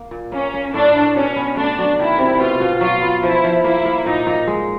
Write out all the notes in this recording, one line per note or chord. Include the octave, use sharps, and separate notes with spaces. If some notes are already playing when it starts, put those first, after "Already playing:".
Already playing: A#3
A#2
A#3 C#4
A#3
A2 D4
A2
B2 C#4
B3
A3 D4
F#3
D#3 E4
C3
B2 F4
B2
F#3 F4
B3
F3 E4
F3
A#3 E4
A#3
A#2 D#4
A#2
G#3